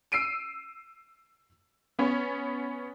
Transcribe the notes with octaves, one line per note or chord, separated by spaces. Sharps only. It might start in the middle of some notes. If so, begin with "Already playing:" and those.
E6 C7 D7 D#7
B3 C#4